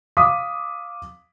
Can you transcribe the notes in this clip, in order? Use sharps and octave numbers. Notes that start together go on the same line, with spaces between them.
F5 D6 D#6 B6